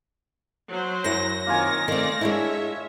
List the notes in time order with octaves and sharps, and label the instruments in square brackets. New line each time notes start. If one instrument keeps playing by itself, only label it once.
[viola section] F#3 C5
[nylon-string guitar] F#2 E4 [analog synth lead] A#6
[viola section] D#3 C4 C#5 [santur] A#3 F4 G#5
[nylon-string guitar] D#3 C4 [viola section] A3 D5 F5
[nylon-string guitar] G#3 D4 E4 [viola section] C#5 E5